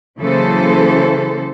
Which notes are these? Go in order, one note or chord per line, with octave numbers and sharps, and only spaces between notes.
C#3 E3 F#3 A#3 A4 C5